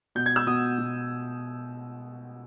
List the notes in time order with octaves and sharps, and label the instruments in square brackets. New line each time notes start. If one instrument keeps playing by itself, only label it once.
[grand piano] B2 G6
G#6
E6
B2 D#6
B2